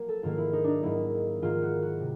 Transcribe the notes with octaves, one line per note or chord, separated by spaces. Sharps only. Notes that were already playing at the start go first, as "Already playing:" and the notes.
Already playing: F#3 A#3
A4
G#2 D#3 F#3 A#3 F4
E4
D#4
D4 D#4
G#2 D#3 F#3 A#3 E4
G#2 D#3 F#3 A#3 F4
F#4
F#4
C3